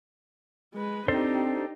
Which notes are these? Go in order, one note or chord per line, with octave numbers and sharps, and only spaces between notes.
G#3 B4
C4 D4 D#4 G4 A4 C5